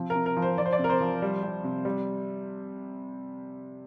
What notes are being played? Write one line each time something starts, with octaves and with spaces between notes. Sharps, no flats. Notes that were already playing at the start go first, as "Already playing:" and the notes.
Already playing: C3 F3
A#4
C3
A#4
F3
C5
F3 D5
C5
D5
C3
A#4
C5
F3
G3
G3
C3
G3